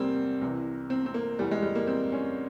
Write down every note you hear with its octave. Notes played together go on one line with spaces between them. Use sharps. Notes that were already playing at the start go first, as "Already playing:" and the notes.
Already playing: E2 C3 G3 A#3 C4
C2 C3 E3
C4
C4
A#3
F1 E2 E3 G3
G#3
G3
A#3
C4
C#4